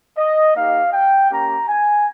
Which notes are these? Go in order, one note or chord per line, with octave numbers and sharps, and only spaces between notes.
D#5
A#3 D#4 G4 F5
G5
A#3 C#4 G4 A#5
G#5